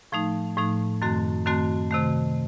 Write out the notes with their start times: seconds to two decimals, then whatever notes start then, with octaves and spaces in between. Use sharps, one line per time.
0.12 A2 F3 A3 D#4
0.57 A2 F3 A3 D#4
1.02 F#2 D#3 A3 C4 F#4
1.46 F#2 D#3 A3 C4 F#4
1.91 C3 D#3 A3